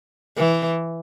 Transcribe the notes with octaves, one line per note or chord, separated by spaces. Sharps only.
E3